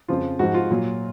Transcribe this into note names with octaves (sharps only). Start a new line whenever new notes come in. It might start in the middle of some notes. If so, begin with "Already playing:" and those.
F2 C#3 F3 F4
G#2 F3 F#4
F4
A#2 F#3